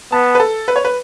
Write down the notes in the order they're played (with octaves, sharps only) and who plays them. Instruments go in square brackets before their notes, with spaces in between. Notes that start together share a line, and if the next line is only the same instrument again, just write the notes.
[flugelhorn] B3 [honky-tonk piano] A5
[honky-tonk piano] B4
A4
B4
C#5
B4